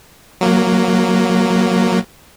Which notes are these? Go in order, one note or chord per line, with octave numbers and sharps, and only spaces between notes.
F#3 A#3